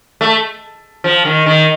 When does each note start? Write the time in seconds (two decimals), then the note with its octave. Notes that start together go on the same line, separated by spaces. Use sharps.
0.21 A3
1.04 F3
1.25 D#3
1.46 D#3